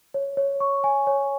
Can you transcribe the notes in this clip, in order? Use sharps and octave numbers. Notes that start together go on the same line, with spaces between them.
C#5
C#5
C#6
G#5
C#5